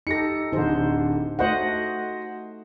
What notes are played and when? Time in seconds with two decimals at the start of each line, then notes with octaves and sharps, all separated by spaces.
0.07 D#4 G4 A4 A#6 C#7
0.53 D1 D3 D#4 C5
1.39 A3 F#4 C5 D#5 F#5